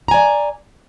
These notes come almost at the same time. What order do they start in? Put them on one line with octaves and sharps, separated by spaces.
A#5 G#5 D5